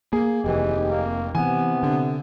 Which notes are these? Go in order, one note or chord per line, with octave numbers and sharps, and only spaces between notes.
A#3 G#4
F1 D#2 E3 G4 D#5
A#3
C3 E3 B3 G#5
D3